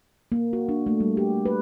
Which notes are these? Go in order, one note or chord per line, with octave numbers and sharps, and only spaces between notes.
A#3
F#4
D4
A3
G3
G4
B4